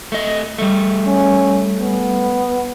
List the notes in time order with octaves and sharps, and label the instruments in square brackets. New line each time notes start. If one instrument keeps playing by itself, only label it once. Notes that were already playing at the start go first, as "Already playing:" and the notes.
[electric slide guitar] A3 D#5
G3 A3
[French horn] C#4
B3